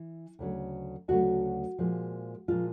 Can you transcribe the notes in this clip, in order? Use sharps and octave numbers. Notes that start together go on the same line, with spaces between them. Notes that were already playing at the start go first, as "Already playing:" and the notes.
Already playing: E3
D2 C#3 F#3 A3
D2 C#3 F#3 A3 F#4
A#2 F3 G#3
A#2 F3 G#3 F4